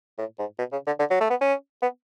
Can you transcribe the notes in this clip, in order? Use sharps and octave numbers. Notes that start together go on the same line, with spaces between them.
A2
G#2
B2
C#3
D3
D3
F#3
A3
B3
C#4
B3